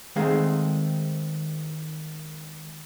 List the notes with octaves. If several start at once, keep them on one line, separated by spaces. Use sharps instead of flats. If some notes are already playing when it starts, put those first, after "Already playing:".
D#3 G#3 A3 C4 G#4 F5